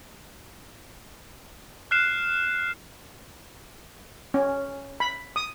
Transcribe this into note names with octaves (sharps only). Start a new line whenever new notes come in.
F6 F#6 C7 E7
C#4
B5
D#6